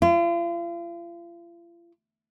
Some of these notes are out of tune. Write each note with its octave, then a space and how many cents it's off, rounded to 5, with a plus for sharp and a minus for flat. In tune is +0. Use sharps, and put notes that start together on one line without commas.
F4 -40